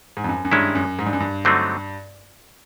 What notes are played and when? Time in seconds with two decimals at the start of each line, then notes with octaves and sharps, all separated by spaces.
0.17 G#2
0.24 F2
0.29 F#2
0.45 F#2
0.51 G2 D#3 G#3 C#4 E4
0.75 F#2
0.99 G#2
1.06 G2
1.13 F#2
1.20 G2
1.45 D3 F#3 A3 C4 D#4